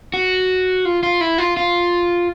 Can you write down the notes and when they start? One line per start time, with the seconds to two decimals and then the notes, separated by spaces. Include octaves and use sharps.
0.14 F#4
0.85 F4
1.03 F4
1.21 E4
1.38 F4
1.57 F4